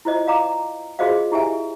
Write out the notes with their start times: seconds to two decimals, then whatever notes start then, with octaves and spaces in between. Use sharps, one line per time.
0.05 E4 F4 C5 D#5
0.26 D5 D#5 F5 A#5 D6
0.99 F4 F#4 G#4 C5 D#5 F5
1.32 E4 G4 E5 G#5